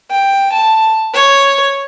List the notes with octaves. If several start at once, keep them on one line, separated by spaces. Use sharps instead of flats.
G5
A5
C#5